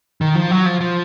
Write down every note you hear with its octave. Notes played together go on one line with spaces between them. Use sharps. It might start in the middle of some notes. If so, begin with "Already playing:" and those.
D#3
F3
F#3
F3
F3